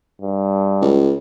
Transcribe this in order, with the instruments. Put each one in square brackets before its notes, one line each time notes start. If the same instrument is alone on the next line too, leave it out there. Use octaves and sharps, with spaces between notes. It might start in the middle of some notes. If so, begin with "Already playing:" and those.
[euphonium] G2
[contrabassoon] C#2